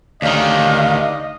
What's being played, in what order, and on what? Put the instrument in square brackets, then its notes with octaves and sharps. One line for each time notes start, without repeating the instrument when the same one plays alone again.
[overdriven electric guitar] D2 D#3 [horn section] C#4 D4 G4 [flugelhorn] D#5 [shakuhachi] F5